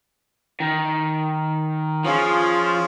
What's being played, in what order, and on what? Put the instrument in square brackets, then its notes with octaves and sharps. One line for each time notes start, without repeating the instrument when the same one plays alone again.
[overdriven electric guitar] D#3
[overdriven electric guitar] F3 [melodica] C#4 F4 G#4